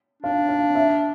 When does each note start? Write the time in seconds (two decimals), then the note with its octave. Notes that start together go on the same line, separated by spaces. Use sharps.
0.23 D4 F5
0.49 F5
0.75 E5